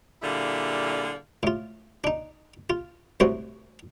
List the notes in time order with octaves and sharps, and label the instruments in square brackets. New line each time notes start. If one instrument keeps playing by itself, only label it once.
[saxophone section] A#2 D3 G3 E4 G#4 F5
[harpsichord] A2 F4
D4 D#4
F4
C2 A2 C3 F#4 C5